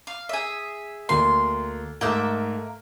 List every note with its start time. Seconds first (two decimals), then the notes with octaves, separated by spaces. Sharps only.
0.07 F5
0.29 G#4 E5
1.09 D2 A#3 C6
2.01 G#2 A3 A#3 E5 G6